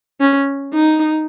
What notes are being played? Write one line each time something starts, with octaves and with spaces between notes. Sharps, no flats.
C#4
D#4